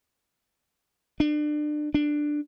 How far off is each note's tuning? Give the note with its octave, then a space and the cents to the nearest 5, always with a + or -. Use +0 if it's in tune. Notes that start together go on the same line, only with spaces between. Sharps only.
D4 +30
D4 +10